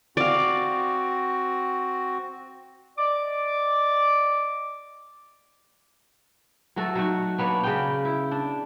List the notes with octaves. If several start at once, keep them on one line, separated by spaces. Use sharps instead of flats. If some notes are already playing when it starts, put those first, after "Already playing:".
C4 F#4 D5 F5
D5 D#5 D6
F#3 A3 F#4 A4
F#3 D#4 F#4
A#3 B3 D4 C#5
C#3 B3 G5
E4
D4